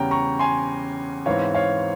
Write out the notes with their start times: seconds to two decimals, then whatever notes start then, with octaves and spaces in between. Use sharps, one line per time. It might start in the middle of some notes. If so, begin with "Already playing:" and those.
Already playing: E2 C#3 G3 C#4 G5 A#5
0.11 A#5 C#6
0.39 G#5 C6
1.26 G#2 E3 G#3 C4 C#5 F5
1.54 C#5 F5